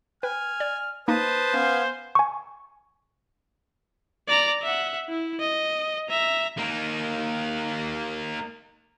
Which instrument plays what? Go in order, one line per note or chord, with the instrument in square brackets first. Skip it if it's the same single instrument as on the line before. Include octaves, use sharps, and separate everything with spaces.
[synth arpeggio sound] B4 G5 [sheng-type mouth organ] G#5 [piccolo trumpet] F6
[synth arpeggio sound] D5
[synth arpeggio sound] A#3 D#4 D#5 [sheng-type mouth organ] B4 A5 D#6 [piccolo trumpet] C5
[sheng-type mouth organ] B3 F5 G#5 [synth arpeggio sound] C#4
[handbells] G#5 C#6
[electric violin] D5 A#5
E5 F#5
E4
D#5
E5 A#5
[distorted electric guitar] A#3 D#4